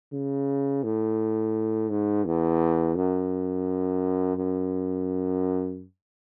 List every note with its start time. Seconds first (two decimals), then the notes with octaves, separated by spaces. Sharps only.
0.13 C#3
0.84 A2
1.89 G#2
2.25 E2
2.96 F#2
4.36 F#2